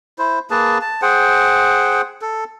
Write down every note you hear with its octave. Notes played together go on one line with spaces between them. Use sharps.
E4 C5
A#3 G#4 B4 A5
A5
G#4 C5 F#5 G5
A4